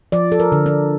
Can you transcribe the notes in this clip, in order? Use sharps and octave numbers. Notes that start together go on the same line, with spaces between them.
F3 D5
A4
A#4
D3
D4